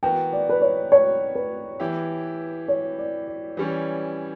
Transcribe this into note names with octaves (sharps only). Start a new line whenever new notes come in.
E3 B3 F#4 A#4 G5
D5
B4
C#5
C#5
B4
E3 B3 E4 G4
C#5
D5
D5
E3 G3 C#4